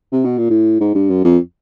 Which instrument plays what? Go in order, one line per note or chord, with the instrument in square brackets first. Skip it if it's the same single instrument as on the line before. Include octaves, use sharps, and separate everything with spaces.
[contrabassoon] C3
B2
A#2
A2
G#2
G2
F#2
F2